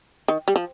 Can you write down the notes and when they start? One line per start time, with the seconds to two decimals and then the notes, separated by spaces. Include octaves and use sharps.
0.28 D#3
0.48 G3
0.56 F3